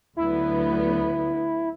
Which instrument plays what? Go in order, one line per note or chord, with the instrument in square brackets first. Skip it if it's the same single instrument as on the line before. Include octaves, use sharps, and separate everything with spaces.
[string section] D2 D3 F#3 B3 [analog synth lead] E4